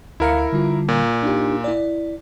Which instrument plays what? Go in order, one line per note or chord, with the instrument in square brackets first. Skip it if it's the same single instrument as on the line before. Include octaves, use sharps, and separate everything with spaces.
[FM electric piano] D2 F5 C#7 [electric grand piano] E4 A#4
[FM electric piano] D3 G3 F4
[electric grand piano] A#2
[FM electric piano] D4 D#4 G4
E4 D5